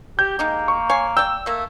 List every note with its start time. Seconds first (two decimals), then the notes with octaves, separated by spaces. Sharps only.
0.19 G4 G6
0.39 G#3 A#3 D#4 G4
0.68 C#6
0.90 C#5 F5 G#5
1.17 D5 G5 E6
1.46 A3 A#3 E5